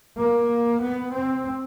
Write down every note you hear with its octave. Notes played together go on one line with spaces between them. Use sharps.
A#3
B3
C4